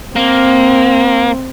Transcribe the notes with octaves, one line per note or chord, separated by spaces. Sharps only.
A#3 C4